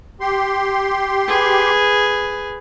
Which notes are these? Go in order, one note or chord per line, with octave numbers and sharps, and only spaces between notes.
G4 C6
G#4 B4